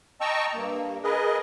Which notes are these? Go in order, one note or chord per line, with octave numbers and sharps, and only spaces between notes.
D#5 G5 A5 A#5 C#6 E6
G2 A#3
G#4 A#4 B4 D#5